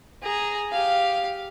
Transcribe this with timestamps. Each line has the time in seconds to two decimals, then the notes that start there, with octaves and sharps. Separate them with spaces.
0.22 G#4 A#5
0.72 G4 F5